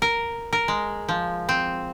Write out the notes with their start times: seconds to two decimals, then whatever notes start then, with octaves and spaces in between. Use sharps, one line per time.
0.02 A#4
0.53 A#4
0.68 G#3
1.09 F3
1.49 C4